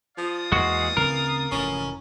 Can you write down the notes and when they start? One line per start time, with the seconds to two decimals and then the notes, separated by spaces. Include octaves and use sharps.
0.18 F3 D5 F5 D#6
0.52 E2 E3 G#3 A#3 F#4
0.97 D2 C#3 C4 A#4
1.52 F1 G#2 E3 C#4